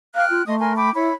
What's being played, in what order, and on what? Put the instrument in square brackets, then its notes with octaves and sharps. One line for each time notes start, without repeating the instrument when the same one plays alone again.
[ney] F5 [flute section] G5 F6 F#6
[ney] F4
[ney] A3 [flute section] D#5 C6 D#6
[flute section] A#4 G#5 C6
G5 B5 D6
[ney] E4 [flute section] C#5 B5